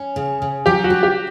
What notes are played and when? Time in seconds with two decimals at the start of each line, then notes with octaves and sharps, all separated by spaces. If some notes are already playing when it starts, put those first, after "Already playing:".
Already playing: C#4
0.16 C#3
0.42 C#3
0.66 F#3 G4
0.84 F#4
0.90 D4
1.03 G4